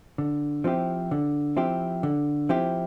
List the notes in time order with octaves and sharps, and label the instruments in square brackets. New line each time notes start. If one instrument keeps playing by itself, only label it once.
[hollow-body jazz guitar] D3
F3 C4 E4 G4
D3
F3 C4 E4 G4
D3
F3 C4 E4 G4